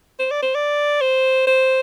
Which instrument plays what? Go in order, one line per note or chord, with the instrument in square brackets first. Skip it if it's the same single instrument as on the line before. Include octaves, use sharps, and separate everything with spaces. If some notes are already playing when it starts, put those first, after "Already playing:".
[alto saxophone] C5
D5
C5
D5
C5
C5